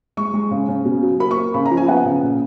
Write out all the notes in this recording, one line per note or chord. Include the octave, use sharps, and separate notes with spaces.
G#3 C#6
G#3
C#3
C#3
B2
F#3
A#3 B5
C#6
A#3
C#3 B5
A#5
F3
G#5
B3 F#5
C#3
A#2